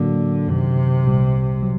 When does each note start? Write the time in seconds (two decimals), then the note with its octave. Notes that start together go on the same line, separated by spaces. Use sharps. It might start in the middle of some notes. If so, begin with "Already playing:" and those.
Already playing: A2 D3 F#3 A#3 D4 F#4
0.47 F#2 C3 D#3 F#3
1.05 C2 A#2 G3
1.63 F#3